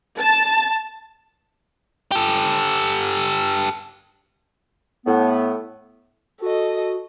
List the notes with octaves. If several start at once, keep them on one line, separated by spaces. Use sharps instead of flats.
A5
G4 A4
A2 B3
F#4 A4 D#5